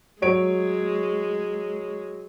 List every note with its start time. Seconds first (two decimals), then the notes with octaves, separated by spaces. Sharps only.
0.22 F#3 G#3 C#5 D7